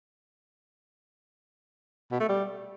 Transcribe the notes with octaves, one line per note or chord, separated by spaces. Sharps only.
B2
A3
G3